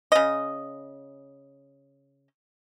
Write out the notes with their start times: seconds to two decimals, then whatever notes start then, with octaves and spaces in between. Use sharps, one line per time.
0.12 C#3 D#5